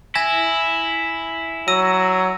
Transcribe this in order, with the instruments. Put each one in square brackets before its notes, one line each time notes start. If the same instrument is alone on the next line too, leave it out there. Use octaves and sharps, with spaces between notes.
[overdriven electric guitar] E4 [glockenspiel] G#5 G#6 A#6
[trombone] F#3 [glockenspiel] E6 A#6 D#7